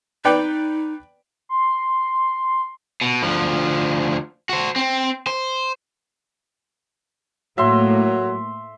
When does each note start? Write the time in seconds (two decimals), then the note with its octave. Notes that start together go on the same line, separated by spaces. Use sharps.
0.25 D#4 B4 D5 G5
1.49 C6
3.01 B2
3.23 D2 F3
4.49 F#4 C5
4.76 C4
5.27 C5
7.58 A2 F#3 A#3 E5 C6